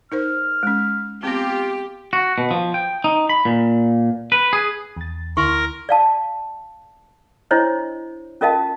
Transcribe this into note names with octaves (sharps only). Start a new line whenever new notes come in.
D#4 A#4 C5 F6
G#3 C#4
B3 C4 F4 G4
F#4
B2
F3
G5
D#4
B5
A#2
B4
G#4
E2 A6
D2 E4 A#4 C6 C#6
D5 F5 A5
D4 E4 C5 C#5 D#5
C#4 F4 A#4 D#5 F5 A5